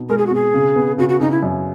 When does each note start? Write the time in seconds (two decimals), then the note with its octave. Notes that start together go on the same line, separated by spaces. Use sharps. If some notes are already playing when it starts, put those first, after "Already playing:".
Already playing: B2 D#4
0.09 G#3 A#4
0.18 G#4
0.27 F#4
0.31 B2 G#4
0.54 C#3
0.76 B3
0.98 C#3 F#4
1.09 F#4
1.20 C#3 D#4
1.31 E4
1.43 F#2